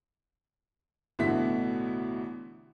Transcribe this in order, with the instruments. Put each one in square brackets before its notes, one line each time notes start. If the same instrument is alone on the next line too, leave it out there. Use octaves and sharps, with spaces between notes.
[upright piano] A1 B2 D3 E4 F#4 B6